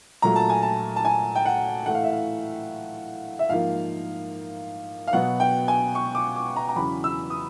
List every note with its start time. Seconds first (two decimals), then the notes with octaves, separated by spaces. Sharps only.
0.22 A#2 F#3 A3 A#5
0.36 A5
0.50 G#5
0.62 A5
0.96 A5
1.05 G#5
1.35 G5
1.45 F#5
1.86 A2 E3 A3 F#5
1.95 F5
2.04 E5
2.12 F5
3.39 E5
3.49 G#2 F3 A#3 F5
5.08 F5
5.13 B2 F#3 B3 F#5
5.40 G5
5.68 G#5
5.95 C#6
6.15 D6
6.36 D6
6.56 A#5
6.69 A#5
6.76 E2 C#3 F#3 B5
7.04 E6
7.30 D#6